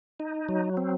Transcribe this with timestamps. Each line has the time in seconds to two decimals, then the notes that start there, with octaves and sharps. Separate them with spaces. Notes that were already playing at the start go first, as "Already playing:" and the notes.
0.20 D#4
0.49 F#3
0.77 C4